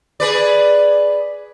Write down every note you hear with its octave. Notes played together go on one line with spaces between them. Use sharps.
G#4 B4 D5